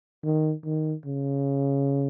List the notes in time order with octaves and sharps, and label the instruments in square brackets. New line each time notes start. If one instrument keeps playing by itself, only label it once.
[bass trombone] D#3
D#3
C#3